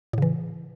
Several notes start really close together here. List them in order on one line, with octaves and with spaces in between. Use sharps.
A2 C#3 E3